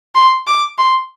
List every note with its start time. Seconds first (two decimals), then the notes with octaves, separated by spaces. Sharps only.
0.15 C6
0.47 D6
0.78 C6